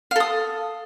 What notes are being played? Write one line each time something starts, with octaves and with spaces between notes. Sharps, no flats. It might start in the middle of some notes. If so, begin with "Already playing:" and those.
A4 F5 D#6